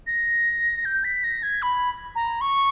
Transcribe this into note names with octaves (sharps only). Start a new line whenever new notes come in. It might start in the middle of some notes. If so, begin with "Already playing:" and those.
A#6
G6
B6
A#6
G#6
B5
A#5
C#6